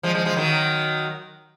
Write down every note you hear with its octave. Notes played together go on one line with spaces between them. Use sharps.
F3 G#3
F3 G#3
F3 G#3
D#3 F#3